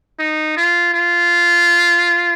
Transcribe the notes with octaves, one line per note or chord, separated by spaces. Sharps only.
D#4
F4
F4